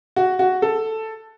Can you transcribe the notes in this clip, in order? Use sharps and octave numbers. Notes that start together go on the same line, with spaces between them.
F#4
F#4
A4